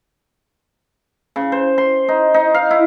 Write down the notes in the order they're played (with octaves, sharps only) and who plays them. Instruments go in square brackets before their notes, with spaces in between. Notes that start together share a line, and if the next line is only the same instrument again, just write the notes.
[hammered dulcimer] C#3
C5
C6
D#4
D#4
F5
E4